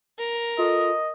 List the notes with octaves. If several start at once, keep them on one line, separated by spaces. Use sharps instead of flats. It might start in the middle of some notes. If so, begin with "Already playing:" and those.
A#4
F4 A4 D#5